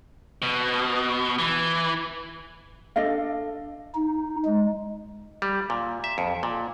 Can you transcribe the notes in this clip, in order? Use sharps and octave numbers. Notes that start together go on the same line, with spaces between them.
B2
E3
D4 A4 D#5 F5
D#4
G#3
G3
A#2
E5
F2
A#2